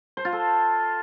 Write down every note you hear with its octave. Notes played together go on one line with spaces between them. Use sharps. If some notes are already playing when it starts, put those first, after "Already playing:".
C5
F4
A4